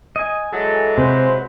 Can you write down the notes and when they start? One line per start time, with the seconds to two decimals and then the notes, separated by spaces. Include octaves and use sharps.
0.16 D#5 G#5
0.53 E3 F#3 G#3 A4
0.98 C3 F#4 B4 C5